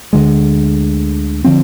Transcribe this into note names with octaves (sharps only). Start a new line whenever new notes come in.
D2 D3 G#3
D3 F3 C4